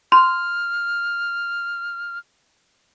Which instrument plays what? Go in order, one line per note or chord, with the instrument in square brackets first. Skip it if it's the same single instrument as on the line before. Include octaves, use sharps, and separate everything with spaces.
[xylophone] C6 [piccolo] F6